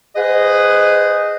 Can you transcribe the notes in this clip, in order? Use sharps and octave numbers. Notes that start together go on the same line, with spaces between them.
G#4 B4 C5 D#5 F#5